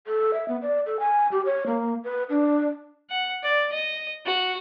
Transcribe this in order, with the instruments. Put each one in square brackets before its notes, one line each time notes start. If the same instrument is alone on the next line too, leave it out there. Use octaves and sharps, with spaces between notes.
[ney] A4
E5
B3
D5
A4
G#5
G4
C#5
A#3
B4
D4
[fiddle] F#5
D5
D#5
F#4